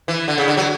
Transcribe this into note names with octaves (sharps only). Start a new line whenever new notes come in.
E3
D3
C#3
D3
F#3